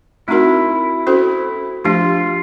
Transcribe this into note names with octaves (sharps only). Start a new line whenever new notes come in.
A3 C4 D#4 E4 F#4 A#4
C#4 F#4 A4 C5
F3 A3 D4 F4 G4